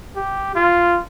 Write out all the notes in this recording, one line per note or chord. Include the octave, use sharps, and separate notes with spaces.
G4
F4